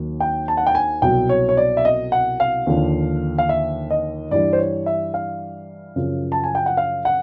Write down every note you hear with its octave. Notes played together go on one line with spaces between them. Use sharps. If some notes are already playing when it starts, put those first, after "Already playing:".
Already playing: D#2 D#3 F#3
G5
A5
F#5
G5
G#5
C2 B2 F#3 G5
C#5
C#5
D5
E5
D#5
F#5
F5
D#2 D3 F3
F5
E5
D#5
G2 E3 G3 D5
C5
C#5
E5
F5
F#2 C#3 F3
A5
G#5
G5
F#5
F5
F#5